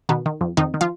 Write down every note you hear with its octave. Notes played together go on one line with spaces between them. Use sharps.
B2 D#3 B3
D#3
F2
F2 D#3 D#4
D#3
F3 F4